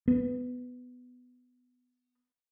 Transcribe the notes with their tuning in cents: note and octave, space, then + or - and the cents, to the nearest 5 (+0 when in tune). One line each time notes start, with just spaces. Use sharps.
B3 +10